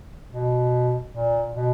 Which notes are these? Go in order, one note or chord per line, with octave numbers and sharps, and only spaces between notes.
B2
A#2
B2